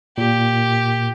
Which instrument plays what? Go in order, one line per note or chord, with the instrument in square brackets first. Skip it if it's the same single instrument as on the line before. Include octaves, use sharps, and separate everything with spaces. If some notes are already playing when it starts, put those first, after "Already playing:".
[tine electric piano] A#2 [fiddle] G4